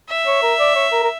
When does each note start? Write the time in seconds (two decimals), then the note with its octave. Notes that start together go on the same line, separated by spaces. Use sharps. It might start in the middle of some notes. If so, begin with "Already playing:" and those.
0.10 E5
0.27 C#5
0.43 A#4
0.59 D5
0.75 C#5
0.92 A#4
1.03 A#4